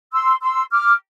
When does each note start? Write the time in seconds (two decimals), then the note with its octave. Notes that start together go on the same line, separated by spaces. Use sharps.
0.12 C6 E6
0.41 C6 E6
0.71 D6 F6